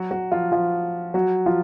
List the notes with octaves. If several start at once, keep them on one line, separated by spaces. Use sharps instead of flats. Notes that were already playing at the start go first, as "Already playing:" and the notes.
Already playing: F#3 F#4
F#3 F#4
F3 F4
F3 F4
F#3 F#4
F3 F4